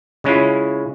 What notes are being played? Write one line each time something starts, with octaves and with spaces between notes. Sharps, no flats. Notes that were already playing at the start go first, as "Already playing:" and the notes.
C#3 G#3 C#4 E4 F4